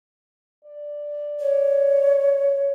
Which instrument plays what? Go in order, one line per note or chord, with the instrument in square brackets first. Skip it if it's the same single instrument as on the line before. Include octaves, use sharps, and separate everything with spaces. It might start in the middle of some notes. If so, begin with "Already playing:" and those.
[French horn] D5
[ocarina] C#5